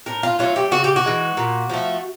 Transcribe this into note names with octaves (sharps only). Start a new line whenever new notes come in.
A2 A#4
F4
F#3 A3 F4
G4
C#3 F#4
G4
F#4
E3 G#3
A#2
F3 A3